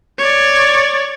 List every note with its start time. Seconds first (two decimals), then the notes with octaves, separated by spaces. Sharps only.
0.18 C#5 D5